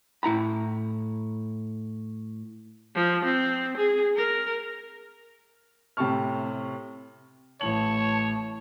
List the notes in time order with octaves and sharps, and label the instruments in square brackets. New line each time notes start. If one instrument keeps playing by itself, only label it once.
[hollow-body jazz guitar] A2 E4 A#5 B5
[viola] F3
C4
G#4
A#4
[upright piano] A2 C3 G4 A5 C#6 F6
[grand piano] A1 A2 F#7 [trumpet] C#5 [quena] A5